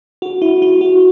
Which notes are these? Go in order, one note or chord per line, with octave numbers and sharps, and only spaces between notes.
F#4
E4
E4
F#4